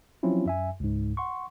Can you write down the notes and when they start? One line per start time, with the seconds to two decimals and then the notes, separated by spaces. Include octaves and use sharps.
0.23 F3 F#3 C4 C#4 E4 F4
0.46 F#2 E5 G#5
0.80 C#2 G#2
1.17 F#5 C6 C#6